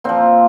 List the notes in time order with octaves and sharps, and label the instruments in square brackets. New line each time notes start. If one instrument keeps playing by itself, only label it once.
[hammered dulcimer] A#2 F3 C4